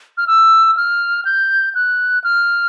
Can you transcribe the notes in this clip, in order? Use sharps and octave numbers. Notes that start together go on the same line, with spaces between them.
F6
E6
F6
G6
F#6
F6